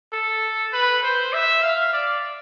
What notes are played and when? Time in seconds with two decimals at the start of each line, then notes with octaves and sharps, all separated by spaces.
0.13 A4
0.73 B4
1.03 C5
1.33 E5
1.62 F5
1.93 D5